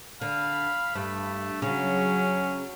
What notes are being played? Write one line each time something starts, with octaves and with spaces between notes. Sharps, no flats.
D3 F5 B5
G2 A3
C#3 F#3 C#4